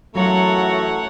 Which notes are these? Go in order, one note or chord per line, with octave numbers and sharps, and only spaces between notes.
F#2 E3 F#3 A3 F4 C#5 F#5 A#5